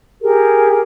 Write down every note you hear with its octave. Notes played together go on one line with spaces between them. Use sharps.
G4 G#4 A#4